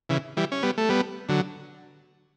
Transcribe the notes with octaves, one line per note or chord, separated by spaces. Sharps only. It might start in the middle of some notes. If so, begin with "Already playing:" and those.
C#3 E3
E3 G3
C#4
G3 B3
A3
G3 B3
D3 F#3